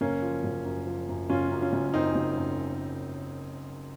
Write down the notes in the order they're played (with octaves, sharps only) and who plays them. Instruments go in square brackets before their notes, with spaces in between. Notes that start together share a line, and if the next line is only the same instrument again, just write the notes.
[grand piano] F#1 A#3 C#4
F3
F#1
F#2
F3
F#2
F#1 C#4 F4
F#2
C#4 F4
F#1
F#2 C4 D#4
F#1
F#2